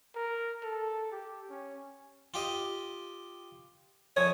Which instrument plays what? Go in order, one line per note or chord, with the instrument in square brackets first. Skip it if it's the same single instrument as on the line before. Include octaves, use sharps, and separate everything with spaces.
[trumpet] A#4
A4
G4
C#4
[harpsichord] F4 G4 D#5
[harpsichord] F2 F3 D#6 [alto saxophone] C#5